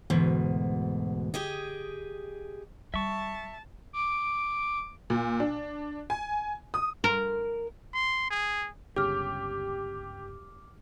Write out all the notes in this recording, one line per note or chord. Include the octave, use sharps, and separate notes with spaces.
D2 G#2 B2 E3
G4 G#4 D#5
G3 E5 A5 C#6
D6
A#2
D4
G#5
D#6
A#4
C6
G#4
G1 C#2 C#3 G4 D6 F6